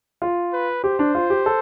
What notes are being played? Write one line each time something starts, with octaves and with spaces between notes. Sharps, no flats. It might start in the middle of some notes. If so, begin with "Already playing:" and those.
F4
B4
G4 C5
D4
F4
G4
A4